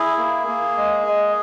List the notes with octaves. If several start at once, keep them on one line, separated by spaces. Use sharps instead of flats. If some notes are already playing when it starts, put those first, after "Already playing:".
Already playing: E4 G#4
A#3
A#3
G#3
G#3